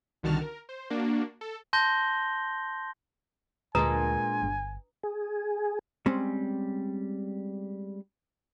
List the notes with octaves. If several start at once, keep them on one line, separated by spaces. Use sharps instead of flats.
C2 D3 D#3 F#4 A5 F6
A#4
C5
A#3 D4 F#4
A4
A5 C6 G6 A#6 G7
D2 A#2 G#3 D4 B4 G#5 A#5 D#6
G1
G#4
G3 G#3 C4 C#4